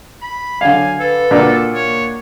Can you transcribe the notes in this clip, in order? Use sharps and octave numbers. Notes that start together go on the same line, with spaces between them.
B5
D3 F#3 F5 G#5
A4 B4
A#2 D4 F#4
A#3 C#5